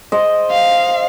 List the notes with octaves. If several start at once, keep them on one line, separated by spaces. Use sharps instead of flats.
C5 D#5
F5